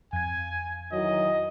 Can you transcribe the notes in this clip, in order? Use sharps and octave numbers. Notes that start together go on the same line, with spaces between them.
F2 G#5 G#6
D#3 E3 F#3 D#5